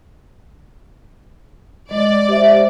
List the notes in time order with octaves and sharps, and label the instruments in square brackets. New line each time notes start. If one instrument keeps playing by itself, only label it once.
[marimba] G#3 D#5 [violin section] D5
[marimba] G4 C5 E5